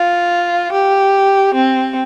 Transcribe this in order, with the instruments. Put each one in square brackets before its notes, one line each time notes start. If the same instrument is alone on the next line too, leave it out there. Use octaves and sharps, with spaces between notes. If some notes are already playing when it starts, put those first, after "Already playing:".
Already playing: [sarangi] F4
G4
C4